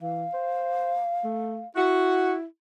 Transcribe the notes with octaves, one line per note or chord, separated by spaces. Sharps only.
E3 F5
C5
A3
E4 F#4